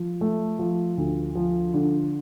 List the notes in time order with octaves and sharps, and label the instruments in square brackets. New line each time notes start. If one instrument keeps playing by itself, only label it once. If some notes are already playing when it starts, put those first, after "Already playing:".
Already playing: [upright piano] F3
A3
F3
D2
F3
D3